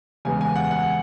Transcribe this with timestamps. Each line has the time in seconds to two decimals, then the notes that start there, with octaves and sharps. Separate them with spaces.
0.25 E2 C#3 G#3 B3 G#5
0.41 G#5
0.56 F#5
0.71 F#5